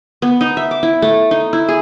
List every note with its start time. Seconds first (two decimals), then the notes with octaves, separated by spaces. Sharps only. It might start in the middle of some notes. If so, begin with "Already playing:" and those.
0.22 B3
0.41 D#4
0.57 E5
0.71 D6
0.83 E4
1.02 A3
1.31 D#4
1.53 E4
1.69 G#4